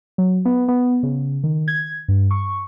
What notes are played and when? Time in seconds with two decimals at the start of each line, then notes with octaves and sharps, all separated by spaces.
0.18 F#3
0.45 B3
0.68 B3
1.03 C#3
1.44 D#3
1.68 G#6
2.08 G2
2.31 C#6